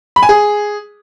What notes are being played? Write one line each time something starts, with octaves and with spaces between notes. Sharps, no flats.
B5
G#5
G#4